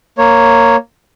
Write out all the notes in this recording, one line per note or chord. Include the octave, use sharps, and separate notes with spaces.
A#3 C#5